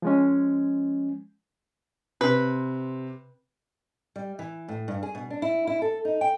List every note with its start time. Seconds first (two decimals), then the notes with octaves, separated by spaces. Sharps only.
0.02 F3 G#3 C#4
2.21 C3 B4
4.16 G3
4.39 E3
4.68 A2
4.88 G2
5.03 G#4
5.15 B2
5.30 D4
5.42 E4
5.67 E4
5.82 A4
6.05 D#4
6.21 G5